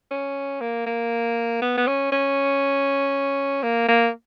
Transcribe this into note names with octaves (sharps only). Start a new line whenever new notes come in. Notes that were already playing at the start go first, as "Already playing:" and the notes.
C#4
A#3
A#3
B3
B3
C#4
C#4
A#3
A#3